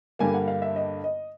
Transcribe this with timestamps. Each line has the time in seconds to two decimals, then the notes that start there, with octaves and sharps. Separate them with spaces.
0.19 G2 D3 G3 A#3 G#5
0.34 F#5
0.48 F5
0.62 E5
0.76 D#5
1.04 D#5